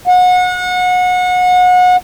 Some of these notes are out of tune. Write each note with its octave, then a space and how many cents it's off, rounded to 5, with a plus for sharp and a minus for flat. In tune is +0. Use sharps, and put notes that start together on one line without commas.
F#5 -30